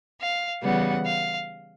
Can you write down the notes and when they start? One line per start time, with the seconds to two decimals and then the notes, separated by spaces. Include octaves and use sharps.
0.20 F5
0.62 C#3 E3 G3 B3 F#5
1.05 F5